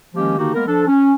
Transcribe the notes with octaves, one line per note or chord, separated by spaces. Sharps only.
D#3 F3 G#3 A#3 C#4 G4
D3 D#3 A#3 D#4 F#4 G4
G#3 A#3 B3 A#4
F3 D4 A4
C#4